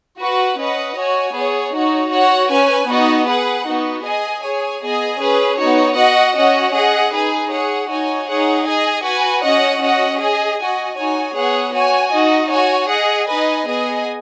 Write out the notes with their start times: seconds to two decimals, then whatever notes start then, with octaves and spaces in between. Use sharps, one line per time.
0.19 F#4 B4 F#5
0.58 C#4 B4 D#5 F#5
0.95 F#4 C#5 G#5
1.34 B3 G#4 C#5
1.73 D#4 F#4 C#5
2.11 F#4 C#5 F#5
2.50 C#4 B4 G#5
2.88 B3 D#4 F#4 D#5
3.27 G#4 B4 F#5
3.66 B3 D#4 F#4
4.04 G#4 D#5 G#5
4.42 G#4 C#5 G#5
4.81 B3 G#4 D#5 G#5
5.19 C#4 G#4 B4
5.57 B3 D#4 F#4 C#5
5.96 F#4 D#5 F#5
6.35 C#4 F#4 D#5 F#5
6.73 G#4 D#5 F#5
7.11 D#4 G#4 B4 G#5
7.51 G#4 C#5 F#5
7.89 D#4 F#4 C#5 G#5
8.27 D#4 G#4 C#5 F#5
8.65 G#4 D#5 G#5
9.03 F#4 B4 G#5
9.42 C#4 F#4 D#5 F#5
9.81 C#4 F#4 D#5 F#5
10.20 G#4 D#5 G#5
10.58 F#4 D#5 G#5
10.96 D#4 F#4 C#5 G#5
11.35 B3 G#4 C#5 F#5
11.74 F#4 C#5 G#5
12.12 D#4 F#4 D#5
12.50 F#4 C#5 G#5
12.89 G#4 D#5 F#5
13.27 D#4 B4 D#5 G#5
13.66 B3 G#4 D#5 G#5